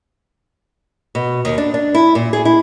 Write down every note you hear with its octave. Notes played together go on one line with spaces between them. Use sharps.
B2
D#2
D4
D4
E4
A#2
G#4
E4